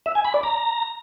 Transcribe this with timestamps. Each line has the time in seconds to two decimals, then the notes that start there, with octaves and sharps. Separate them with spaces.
0.06 E5
0.15 G#5
0.25 B5
0.34 D5
0.43 A#5